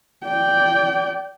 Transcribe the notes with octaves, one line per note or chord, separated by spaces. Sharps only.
D5 G5